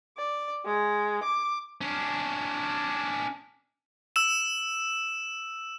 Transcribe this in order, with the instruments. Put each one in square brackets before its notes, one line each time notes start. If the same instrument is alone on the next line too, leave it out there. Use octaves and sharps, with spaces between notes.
[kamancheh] D5
G#3
D6
[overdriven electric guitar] C#4 D4
[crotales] E6 E7